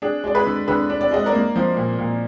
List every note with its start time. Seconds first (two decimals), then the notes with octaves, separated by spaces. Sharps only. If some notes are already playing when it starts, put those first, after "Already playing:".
0.02 D4 G#4
0.24 G#3 D5
0.35 G#4 B4
0.46 D3
0.68 D3 G#4 B4
0.90 D4
1.01 D5
1.11 G#3 D#5
1.26 A#4 D5
1.33 A#3
1.56 F3
1.77 A#2
1.99 A#2